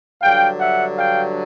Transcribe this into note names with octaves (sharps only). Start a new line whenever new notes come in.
G2 D3 F#3 F5 G5
E5 F#5
F5 G5